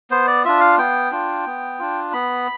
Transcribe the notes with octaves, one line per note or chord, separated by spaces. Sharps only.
B3 C5
D5
D4 F4 E5
F5
B3 G5
D4 F4
B3
D4 F4
B3 B5